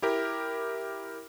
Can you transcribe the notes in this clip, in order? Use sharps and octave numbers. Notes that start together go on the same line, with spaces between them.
E4 G4 A#4